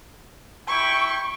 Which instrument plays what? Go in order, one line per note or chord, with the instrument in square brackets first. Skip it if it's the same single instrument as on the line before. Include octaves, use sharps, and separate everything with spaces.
[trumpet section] E4 G5 [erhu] C#6